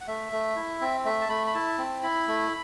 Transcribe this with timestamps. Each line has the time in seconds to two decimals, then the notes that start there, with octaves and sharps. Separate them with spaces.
0.01 F#5
0.07 A3 E5
0.33 A3
0.56 E4
0.81 C4
1.05 A3 E5
1.21 A5
1.29 A3 B5
1.47 B5
1.54 E4 A5
1.78 C4
2.03 E4 B5
2.28 A3